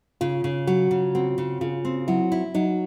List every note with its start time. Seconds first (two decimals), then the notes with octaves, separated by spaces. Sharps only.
0.21 C#3 F4
0.44 C#3
0.67 F#3 F#4
0.91 C#3
1.15 C4 F#4
1.38 C#3
1.61 C#3 F4
1.85 C4
2.08 F#3 E4
2.32 E4
2.55 F#3 D#4